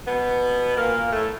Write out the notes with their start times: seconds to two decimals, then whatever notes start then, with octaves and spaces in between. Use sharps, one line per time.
0.06 B2 B3
0.77 A#2 A#3
1.13 A2 A3